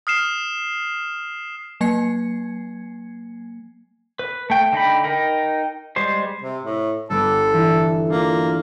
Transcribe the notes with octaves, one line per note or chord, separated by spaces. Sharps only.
D#6 F6 C7 E7
F#3 A#3 G#5 G#6 C7 C#7
B4
A3 G5
D3 D#4 G5 B5
D#4 A#4 G5
G3 G#3 C5
C3
A2
G1 B3 A4 D6
E3
A#3 D4 F4